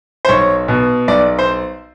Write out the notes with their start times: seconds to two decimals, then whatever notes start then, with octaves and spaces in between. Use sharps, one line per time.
0.25 C5
0.29 B1 C#5
0.68 B2
1.08 B1 D5
1.39 C5